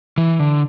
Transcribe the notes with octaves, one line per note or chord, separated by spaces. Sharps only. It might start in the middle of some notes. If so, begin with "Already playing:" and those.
E3
D3